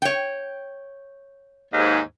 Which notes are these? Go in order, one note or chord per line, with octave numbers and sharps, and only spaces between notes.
C#5 G5
D#2 G#2